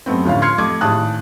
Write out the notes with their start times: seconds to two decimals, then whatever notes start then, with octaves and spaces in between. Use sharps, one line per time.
0.06 F#2 A3 B3 C4
0.25 D2 A2 F3 C#4 F4 F5
0.42 F5 C6 F6 G#6 C7 C#7
0.58 F2 A3 D#5 D6 G#6
0.81 G#1 A2 G#4 A5 D#6 F#6